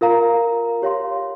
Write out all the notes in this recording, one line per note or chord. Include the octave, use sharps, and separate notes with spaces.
F4 A#4 F5 A#5
G4 C#5 F5 C6